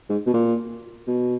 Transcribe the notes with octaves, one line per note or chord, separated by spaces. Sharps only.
G#2
B2
A#2
B2